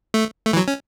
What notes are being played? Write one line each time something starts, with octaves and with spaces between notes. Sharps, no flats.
A3
A3
E3
F#3
C#4